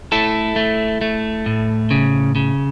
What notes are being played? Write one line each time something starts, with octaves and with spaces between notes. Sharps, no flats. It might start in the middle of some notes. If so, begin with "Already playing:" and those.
A3 E4 A4
A3
A3
A2
C#3
C#3